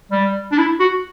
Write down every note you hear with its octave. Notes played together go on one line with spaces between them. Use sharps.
G3
D4
E4
F#4